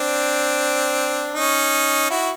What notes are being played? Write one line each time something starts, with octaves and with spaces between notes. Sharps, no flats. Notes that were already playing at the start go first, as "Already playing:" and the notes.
Already playing: C4 D4
C#4 D#4
E4 F#4